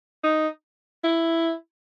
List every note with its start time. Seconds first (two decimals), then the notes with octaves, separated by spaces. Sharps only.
0.23 D#4
1.04 E4